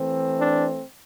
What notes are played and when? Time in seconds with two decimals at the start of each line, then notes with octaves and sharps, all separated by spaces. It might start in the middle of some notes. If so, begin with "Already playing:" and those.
Already playing: E3 A3 C4
0.38 D4